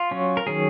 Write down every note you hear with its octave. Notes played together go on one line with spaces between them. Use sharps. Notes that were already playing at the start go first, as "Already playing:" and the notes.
Already playing: F4
F#3 C#4
A#4
D#3 F#3 C#4 G#4